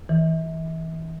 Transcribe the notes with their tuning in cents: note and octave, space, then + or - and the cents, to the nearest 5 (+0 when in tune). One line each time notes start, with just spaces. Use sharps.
E3 -25